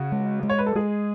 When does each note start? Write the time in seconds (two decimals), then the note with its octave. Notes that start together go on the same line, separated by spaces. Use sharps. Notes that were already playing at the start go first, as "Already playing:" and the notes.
Already playing: C#3 F#4
0.12 G#3
0.43 G#3
0.50 C#5
0.59 B4
0.66 A4
0.75 G#3 G#4